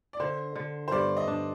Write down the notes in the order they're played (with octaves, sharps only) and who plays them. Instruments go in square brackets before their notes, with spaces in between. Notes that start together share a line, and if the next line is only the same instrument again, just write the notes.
[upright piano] D5
[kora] D3 [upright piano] C5
[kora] D3
[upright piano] C5
[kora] G2 [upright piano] D5
[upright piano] D#5
[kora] D4